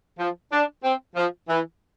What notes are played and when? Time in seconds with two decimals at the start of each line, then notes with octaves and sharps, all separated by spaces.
0.19 F3
0.52 D4
0.84 C4
1.16 F3
1.49 E3